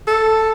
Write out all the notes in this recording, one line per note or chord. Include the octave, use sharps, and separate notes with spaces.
A4